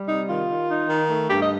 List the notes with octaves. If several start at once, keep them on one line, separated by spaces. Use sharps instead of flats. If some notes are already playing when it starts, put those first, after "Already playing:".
Already playing: G3
C3 D#4
D#3 F4
D#3
D#4
D#3
A3
G2 G4
D#5